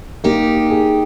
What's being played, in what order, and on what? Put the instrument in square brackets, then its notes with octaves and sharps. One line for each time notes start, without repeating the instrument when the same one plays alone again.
[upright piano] A#3 [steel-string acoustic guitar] D#4 G4
[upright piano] G#4